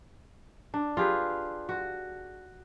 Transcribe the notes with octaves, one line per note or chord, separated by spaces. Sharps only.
D4
F4 G4 G#4 B4
F#4